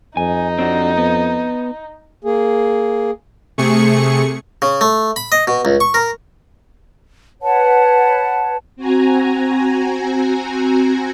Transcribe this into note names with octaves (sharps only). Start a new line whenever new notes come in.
F2 D#4 G#5
C4 D4 F#4
B3
A#3 G#4
C3 A3 G#4 C#6 C#7
C#3
A3
B5
D#5
B2
C#2
C#6
A#4
B4 C#5 F#5 A5
C4 F#4 G#5 A#5